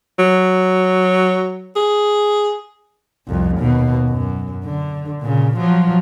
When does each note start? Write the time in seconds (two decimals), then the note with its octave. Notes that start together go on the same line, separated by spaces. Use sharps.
0.19 F#3
1.76 G#4
3.28 C2 F2
3.58 D#2 B2
4.09 F#2
4.65 D3
5.21 A#2 C#3
5.57 F3 F#3